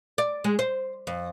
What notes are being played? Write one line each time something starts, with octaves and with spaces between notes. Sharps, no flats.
D5
G#3
C5
F2